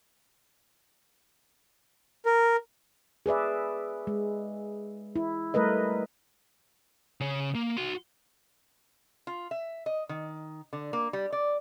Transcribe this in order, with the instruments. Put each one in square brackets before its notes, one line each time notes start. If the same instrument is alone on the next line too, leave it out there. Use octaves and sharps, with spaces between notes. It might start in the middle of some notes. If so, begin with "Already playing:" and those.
[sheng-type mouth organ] A#4
[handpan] G#4 B4 D5 E5
G#3
E4
G3 A3 A#4 B4 D#5
[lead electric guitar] C#3 C#5
A#3
F#4 C6
[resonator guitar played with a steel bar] F4
E5
D#5
D#3
D3
A#3
G3
D5